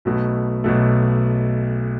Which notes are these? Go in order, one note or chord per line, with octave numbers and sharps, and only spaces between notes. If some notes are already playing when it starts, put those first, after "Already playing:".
B1 B2 A3
B1 B2 A3